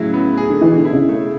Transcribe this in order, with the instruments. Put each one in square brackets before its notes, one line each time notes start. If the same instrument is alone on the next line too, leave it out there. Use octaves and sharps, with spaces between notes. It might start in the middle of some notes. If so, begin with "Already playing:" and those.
Already playing: [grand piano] A2 F#3 E4 [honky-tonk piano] C#3
[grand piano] B3
G#4
[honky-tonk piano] D3
[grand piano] B2 [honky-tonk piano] E3
[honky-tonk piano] D3
[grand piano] E4
[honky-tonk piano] C#3
[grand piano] A3